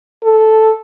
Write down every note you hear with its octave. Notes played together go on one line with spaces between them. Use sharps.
A4